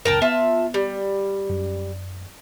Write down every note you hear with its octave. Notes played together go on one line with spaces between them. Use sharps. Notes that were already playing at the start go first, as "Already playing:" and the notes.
F#1 C#2 A#4 G5 A5
B3 F4 E5 A5
G3
F#2